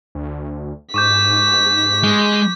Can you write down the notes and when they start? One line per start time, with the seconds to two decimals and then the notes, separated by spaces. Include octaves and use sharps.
0.15 D2
0.94 G#2 C#6 D6 G6 B6
2.03 G#3